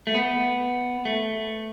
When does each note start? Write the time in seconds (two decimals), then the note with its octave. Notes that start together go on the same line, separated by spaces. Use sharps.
0.07 A3
0.15 B3
1.05 A3